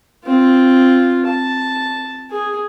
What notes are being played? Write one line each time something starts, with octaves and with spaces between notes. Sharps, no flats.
C4 F4
A5
G#4